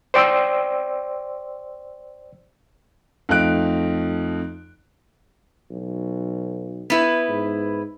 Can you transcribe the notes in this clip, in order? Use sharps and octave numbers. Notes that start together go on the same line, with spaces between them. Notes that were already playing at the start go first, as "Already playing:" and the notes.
C5 D5 G5 C6 E6
F2 A3 D#4 F#6 D7
B1
B3 E4 B4
G#2